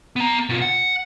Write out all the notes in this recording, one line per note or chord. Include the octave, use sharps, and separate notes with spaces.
B3 A#5
B2 F4
F#5